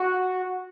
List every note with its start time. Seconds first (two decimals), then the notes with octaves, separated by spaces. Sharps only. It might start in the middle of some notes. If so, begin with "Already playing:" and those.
Already playing: F#4